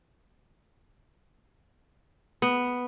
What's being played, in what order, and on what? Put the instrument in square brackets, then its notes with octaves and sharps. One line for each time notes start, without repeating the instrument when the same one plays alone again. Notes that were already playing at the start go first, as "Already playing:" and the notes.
[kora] B3